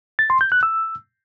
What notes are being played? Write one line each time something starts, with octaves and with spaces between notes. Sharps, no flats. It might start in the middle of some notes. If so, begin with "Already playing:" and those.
A6
C6
G6
F#6
E6